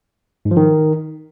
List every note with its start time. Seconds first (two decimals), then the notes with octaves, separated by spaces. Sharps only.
0.45 G#2
0.51 F3
0.57 D#3